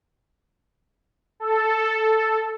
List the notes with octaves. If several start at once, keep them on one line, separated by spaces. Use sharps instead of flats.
A4